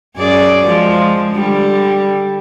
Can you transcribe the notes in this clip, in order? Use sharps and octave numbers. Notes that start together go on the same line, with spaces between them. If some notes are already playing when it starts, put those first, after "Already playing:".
F#2 G#4 D5
F3 G#3
D3 G3